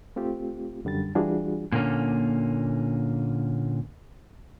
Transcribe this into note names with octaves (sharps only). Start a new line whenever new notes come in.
A3 C4 F4 G4
F#2 D3 G3 A6
E3 G3 D4 F4 F#4 G#4
A#2 D3 A#3 C#4